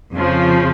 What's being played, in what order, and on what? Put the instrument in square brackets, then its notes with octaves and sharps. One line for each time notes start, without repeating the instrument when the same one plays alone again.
[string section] F2 C#3 F3